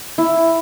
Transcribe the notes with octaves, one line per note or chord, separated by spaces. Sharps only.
E4